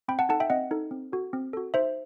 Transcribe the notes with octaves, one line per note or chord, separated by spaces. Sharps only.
C4 G5 B5
F#5 A5
D#4 A4 F#5 A5
E5 G5
C4 D#5 F#5
D#4 A4
C4
F#4 A4
C4
F#4 A4
D#4 C5 E5